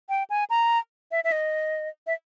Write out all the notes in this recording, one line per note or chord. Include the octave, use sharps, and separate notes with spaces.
G5
G#5
A#5
E5
E5
D#5
E5